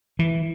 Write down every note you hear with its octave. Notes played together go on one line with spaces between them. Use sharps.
E3